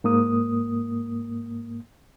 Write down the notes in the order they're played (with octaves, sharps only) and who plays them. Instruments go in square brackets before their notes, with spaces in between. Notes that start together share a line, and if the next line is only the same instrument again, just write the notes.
[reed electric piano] G#2 A#3 D#6